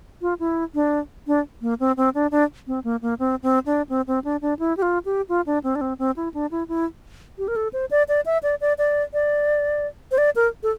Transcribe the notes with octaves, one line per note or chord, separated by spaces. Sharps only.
F4
E4
D4
D4
A#3
C4
C4
D4
D4
C4
A#3
A#3
C4
C4
D4
C4
C4
D4
D4
E4
G4
F4
G4
F4
D4
C4
D4
C4
C4
E4
D4
E4
E4
G4
A#4
A4
C5
D5
D5
E5
D5
D5
D5
D5
C5
D5
A#4
A4